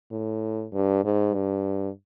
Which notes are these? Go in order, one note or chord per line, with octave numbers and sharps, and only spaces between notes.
A2
G2
G#2
G2